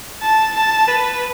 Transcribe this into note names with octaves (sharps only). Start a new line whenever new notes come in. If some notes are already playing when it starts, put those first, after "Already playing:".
A5
A5
B4